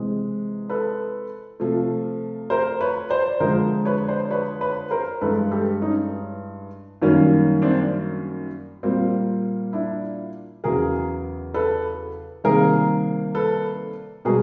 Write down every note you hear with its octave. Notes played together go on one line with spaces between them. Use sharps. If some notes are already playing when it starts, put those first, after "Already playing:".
Already playing: C3 E3 G#3
A4 B4
C3 F3 A3
A#4 C5
B4 C#5
C5 D5
F2 D3 F3 G#3 A#4 C5
B4 C#5
C5 D5
B4 C#5
B4 C#5
A#4 C5
G2 E3 G#3 A4 B4
G4 A4
C#4 D#4
F#2 D#3 G3 A#3 C#4
C4 D4
A#2 G3 A#3 C4
D4 E4
E2 C#3 F#3 G#4 A#4
A4 B4
C3 D#3 G3 A#3 G#4 A#4
A4 B4
B2 G3 G#4 A#4